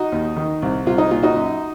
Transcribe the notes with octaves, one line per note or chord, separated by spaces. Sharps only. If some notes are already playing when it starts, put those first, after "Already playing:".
Already playing: D#4 F#4
D#2
D#3
C2
C2 F4
D#4
A#2 F4
D#4 F#4
F#2